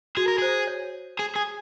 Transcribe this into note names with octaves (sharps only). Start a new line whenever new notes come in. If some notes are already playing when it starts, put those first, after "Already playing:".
F#4 G#4
A#4
G#4 C5
C#5
G#4
G#4